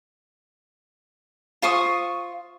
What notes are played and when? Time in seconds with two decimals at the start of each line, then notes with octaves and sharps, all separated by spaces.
1.62 F4 C5 C#6 D#6